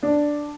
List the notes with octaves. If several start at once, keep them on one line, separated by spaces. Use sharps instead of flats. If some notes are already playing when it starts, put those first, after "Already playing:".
D4